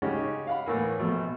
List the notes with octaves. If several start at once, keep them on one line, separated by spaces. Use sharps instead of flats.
C#3 G#3 C#4 D#4 F#4 G4
F5 F#5 B5
A2 E3 A#3
A#1 B2 A3